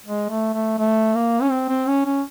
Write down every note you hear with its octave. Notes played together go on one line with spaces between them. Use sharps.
G#3
A3
A3
A3
A#3
C#4
C4
C4
C#4
C#4